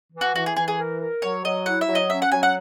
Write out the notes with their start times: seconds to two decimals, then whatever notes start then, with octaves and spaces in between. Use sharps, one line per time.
0.13 E3
0.21 F#4
0.36 E3 F#4
0.46 G#4
0.56 E3 G#4
0.68 G#4
0.78 A#4
1.01 A#4
1.22 F#3 C#5
1.45 F#3 D#5
1.66 E4 F#5
1.81 E5
1.88 F#3
1.95 D#5
2.10 C#4 E5
2.22 F#5
2.32 F#3 G#5
2.43 F#5